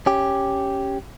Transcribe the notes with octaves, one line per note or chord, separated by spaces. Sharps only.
C#4 G4